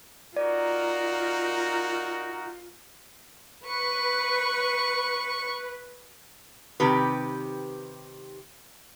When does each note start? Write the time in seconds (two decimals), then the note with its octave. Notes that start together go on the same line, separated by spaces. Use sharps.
0.36 D#4 F4 F#4 A#4 D5
3.66 B4 C#6
6.80 C3 D#3 G4 B4